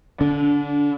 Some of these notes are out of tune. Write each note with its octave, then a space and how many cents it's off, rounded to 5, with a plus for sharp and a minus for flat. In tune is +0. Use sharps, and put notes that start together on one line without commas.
D3 -15 D4 -35